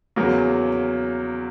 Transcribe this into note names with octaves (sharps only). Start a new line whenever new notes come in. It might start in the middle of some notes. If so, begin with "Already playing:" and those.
E2 C#3 F#3 A#3